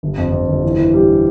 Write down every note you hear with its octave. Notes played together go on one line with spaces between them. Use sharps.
G1
F2
F2
G1
E3
E3
G3